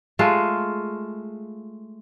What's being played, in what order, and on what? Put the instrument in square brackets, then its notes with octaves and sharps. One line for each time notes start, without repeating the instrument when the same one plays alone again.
[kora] G#3 A3 F4